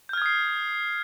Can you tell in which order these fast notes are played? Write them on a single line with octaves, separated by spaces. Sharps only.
G6 F6 G#6 D#6 C7